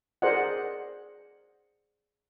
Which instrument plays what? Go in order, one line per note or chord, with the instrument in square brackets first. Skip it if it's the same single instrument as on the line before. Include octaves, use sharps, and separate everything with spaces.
[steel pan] G#4 A#4 C5 D5 D#5 F#5